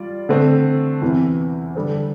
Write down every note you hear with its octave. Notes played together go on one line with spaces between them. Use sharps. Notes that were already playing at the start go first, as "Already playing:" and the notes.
Already playing: G3 F4 D5
D3 A3 C4
E2 C3 E3
D3 G3 D4 A4 C5